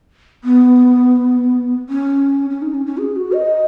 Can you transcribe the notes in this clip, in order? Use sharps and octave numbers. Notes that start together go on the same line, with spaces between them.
B3
C#4
C#4
D#4
C#4
C#4
G#4
F#4
D#5